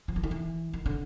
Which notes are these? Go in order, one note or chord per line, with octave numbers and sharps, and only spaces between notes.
F3
E3
D#3
E3
D#3
D3